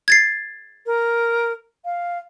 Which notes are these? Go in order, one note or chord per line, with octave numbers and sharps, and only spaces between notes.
G#6 A6 C7
A#4
F5